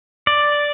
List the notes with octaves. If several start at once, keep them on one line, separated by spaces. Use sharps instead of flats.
D5